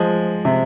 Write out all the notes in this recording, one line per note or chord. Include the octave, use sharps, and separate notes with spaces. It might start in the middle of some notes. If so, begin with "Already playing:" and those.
Already playing: F3 G#3
C3